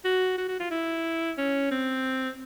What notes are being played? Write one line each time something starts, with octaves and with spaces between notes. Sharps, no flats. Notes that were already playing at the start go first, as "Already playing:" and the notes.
F#4
F#4
F#4
F4
E4
C#4
C4